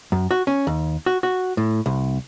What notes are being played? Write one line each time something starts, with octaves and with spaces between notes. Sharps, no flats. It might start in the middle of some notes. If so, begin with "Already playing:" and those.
F#2
F#4
C#4
D#2
F#4
F#4
A2
C2